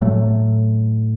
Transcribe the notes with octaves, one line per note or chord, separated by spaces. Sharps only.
A2 F#3 A3